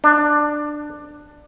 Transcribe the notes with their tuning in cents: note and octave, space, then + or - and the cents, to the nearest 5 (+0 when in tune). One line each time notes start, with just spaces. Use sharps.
D4 +15